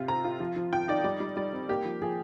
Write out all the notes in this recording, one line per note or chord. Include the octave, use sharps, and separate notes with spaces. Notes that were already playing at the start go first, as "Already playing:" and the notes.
Already playing: C3 F4
C4 A#5
F4
F3
F3
F3 G5
D#4 D5
G3 D5
G3
G3 D5
C4
A#3 G4
F3
F3 G#4